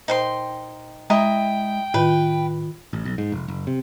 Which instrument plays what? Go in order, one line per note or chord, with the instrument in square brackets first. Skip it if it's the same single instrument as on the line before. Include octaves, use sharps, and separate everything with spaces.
[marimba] A#2 C5 [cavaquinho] D#4 G5 C6
[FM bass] G#3 [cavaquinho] E4 D#5 A#5 [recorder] G5
[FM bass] A2 [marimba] D#3 F4 [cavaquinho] B4
[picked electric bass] A1
B1
G#2
F1
F#1
C3